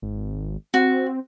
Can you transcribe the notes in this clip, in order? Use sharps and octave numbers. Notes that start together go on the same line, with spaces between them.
G#1
C4 F#4